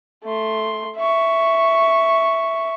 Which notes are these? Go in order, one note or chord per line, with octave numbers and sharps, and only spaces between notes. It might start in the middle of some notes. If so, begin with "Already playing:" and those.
A3 C6
E5 C#6